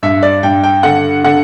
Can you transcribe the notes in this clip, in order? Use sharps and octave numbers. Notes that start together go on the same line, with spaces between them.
G2 E5
D5
G2 G5
G5
D3 F#5
D3 F#5